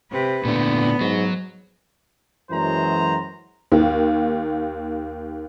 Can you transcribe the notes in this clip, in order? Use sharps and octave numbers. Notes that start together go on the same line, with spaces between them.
C3 B4
A#2 D3 A3 B3 D4
G#2 F#3
F#2 E3 F#3 G#3 C5 A#5
D#2 A#3